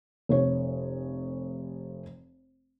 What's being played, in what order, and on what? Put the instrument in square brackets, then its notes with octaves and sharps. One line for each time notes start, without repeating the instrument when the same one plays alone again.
[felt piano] F1 C#5